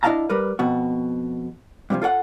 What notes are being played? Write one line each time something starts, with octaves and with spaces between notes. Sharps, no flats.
D4 E4 D#5 F5 A5 A#5
G3 A#4 B4
F2 B2 F#4
G2 C3 E3 F3
F4 A4 C#5 F#5